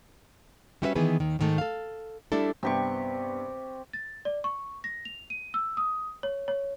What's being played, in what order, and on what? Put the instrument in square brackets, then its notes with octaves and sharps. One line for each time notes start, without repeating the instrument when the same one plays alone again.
[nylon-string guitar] G3 C#4 E4 F#4 B4 E5
D#3 E3 B3 G#4 B4
D#2 D#3
G#2 D#3 A3
A4 F5
G3 A3 D4 E4 A4
[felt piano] G2 B3 [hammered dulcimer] C3 G4 C#6
[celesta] A6
D5
C#6
A#6
F7
D#7
E6
D#6
C#5
C#5